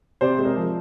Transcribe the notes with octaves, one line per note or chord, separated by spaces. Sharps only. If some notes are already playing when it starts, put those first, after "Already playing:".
C3 C5 D5
G#3
G#4 A#4
F3